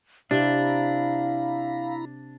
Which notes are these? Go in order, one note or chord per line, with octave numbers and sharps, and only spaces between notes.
C3 D4 E4 F5 A#5 B5